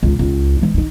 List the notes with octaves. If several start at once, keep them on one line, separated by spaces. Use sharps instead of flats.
C#2
C#2
E3 G#3
D4 D#4